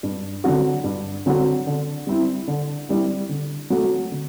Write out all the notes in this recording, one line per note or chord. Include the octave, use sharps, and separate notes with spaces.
G2
D3 F#3 C4 F#4
G2
D3 F#3 C4 F#4
D3
G3 C4 E4
D3
G3 C4 E4
D3
F#3 A3 C4 F#4
D3